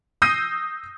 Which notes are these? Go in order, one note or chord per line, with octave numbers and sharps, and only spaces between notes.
D#6 E6 G6 A#6 C7 D#7